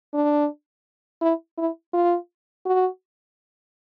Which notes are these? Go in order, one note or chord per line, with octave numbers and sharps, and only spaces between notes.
D4
E4
E4
F4
F#4